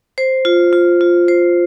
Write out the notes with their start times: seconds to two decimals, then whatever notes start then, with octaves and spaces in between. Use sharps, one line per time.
0.18 C5
0.45 F4
0.73 F4
1.01 F4
1.28 C5